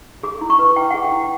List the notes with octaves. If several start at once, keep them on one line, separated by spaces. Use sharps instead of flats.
G#4 D6
E4
C#6
B4
E4 G5
G#4 F#5
G5
E4